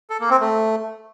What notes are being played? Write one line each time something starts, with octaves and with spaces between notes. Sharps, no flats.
A4
A#3
C4
A3